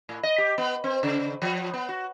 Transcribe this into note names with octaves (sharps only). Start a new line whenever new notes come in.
A2
D#5
G4
B3
C4
C#3
F3
B3
F#4